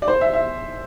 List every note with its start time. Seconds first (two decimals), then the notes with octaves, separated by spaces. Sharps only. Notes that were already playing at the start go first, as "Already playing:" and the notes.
0.02 D5
0.08 C5
0.21 E5
0.33 E5